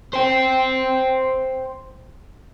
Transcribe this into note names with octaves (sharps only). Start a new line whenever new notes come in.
C5 G5